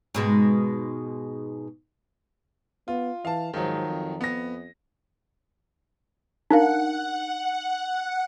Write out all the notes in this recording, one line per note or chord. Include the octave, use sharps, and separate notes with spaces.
G#2 B2 G#3
B3 F4
E3 F5 A5
G#2 D#3 F3 F#3
F2
B3 A#6
D4 D#4 A#4 F5 F#5